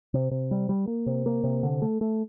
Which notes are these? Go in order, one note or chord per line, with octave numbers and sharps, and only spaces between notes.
C3
C3
G3
G3
A#3
C3
A#3
C3
D3
A3
A3